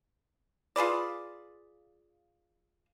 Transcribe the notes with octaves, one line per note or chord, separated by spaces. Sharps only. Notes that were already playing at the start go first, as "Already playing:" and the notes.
F4 G#4 B4 D5